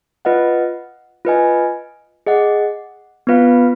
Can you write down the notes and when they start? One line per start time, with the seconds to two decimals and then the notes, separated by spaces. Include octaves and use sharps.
0.25 F4 B4 D#5 F#5
1.25 F4 B4 D#5 G#5
2.27 G#4 D#5 F#5
3.27 B3 F4 B4 F5